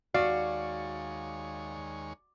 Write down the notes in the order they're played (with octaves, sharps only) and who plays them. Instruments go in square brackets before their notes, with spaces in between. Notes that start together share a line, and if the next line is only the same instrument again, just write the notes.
[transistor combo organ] D#2 G#3 C#5 [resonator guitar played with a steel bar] F#4 [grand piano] D5 [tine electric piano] F5